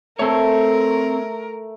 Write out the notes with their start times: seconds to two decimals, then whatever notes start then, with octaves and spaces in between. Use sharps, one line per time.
0.19 A3 C4 A#4 C#5